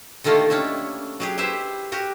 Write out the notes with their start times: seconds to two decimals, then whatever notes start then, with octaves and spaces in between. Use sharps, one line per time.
0.24 D3 D#3 A3 A#3 F4 G4
0.50 C#4 D4 E4 E5
1.20 F#3 G4 G#4
1.37 E4 G4 B4 C5 E5
1.92 F#4 G4 A#4